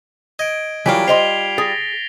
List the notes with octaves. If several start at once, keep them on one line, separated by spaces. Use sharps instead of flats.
D#5 G#6 D7
E3 F#3 G3 A#3 F4 B6 D7
C5 D#5 C6 C7 F7 G7
G#4 A6 A#6